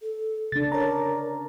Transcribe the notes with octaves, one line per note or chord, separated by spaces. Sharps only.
A4
C#3 D4 A6
A#4 C#5 A#5